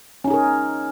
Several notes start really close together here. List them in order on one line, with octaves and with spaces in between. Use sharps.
C#4 D#4 G#4 A#4